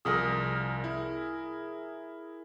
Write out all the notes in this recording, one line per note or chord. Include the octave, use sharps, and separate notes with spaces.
C2 F3 G#4 A#4 E6
E4